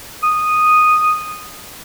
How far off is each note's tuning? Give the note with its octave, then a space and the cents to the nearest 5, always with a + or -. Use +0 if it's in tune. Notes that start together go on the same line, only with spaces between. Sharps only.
D#6 -5